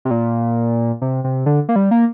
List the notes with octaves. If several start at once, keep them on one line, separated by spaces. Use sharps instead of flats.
C3
A#2
C3
C3
D3
A#3
G3
A#3